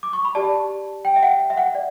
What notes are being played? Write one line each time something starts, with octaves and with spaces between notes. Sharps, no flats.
D6
C#6
B5
G4 D5 A5
G5
E5
F#5
E5
F#5
D5